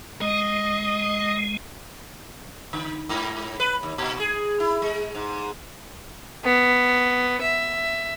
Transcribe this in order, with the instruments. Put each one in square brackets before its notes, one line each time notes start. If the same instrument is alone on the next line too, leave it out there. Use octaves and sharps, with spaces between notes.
[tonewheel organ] G#3 [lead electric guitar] D#5
[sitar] D3
G#2
B4
D#2
A#2
G#4
E4
G#3
G#2
[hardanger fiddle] B3
E5